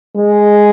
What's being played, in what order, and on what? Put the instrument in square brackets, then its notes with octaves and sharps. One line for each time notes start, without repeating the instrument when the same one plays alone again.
[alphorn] G#3